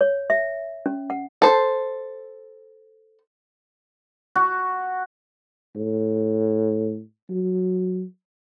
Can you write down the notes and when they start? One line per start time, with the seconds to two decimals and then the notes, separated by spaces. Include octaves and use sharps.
0.01 C#5
0.30 E5
0.86 C#4
1.10 F#5
1.42 A4 C5
4.36 F#4
5.76 A2
7.30 F#3